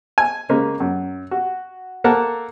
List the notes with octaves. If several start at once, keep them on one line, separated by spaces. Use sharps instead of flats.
G#5
C#3 G#3 A#3
F#2
F#4
A#3 A4 A#4 F#5 A5